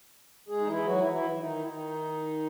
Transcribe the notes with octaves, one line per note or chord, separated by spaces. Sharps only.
G#3 G#4
D#4
E3 E4
F#3 F#4
E3 E4
E3 E4
D#3 D#4
E4
D#3 D#4